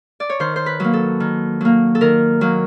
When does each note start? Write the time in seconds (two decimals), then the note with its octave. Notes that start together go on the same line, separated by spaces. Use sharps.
0.20 D5
0.30 C#5
0.40 D#3 C5
0.56 C5
0.66 B4
0.80 F#3 A#3
0.93 A4
1.20 D#3
1.61 F#3 A#3
1.95 A4
2.01 D#3 A#4
2.41 F#3 A#3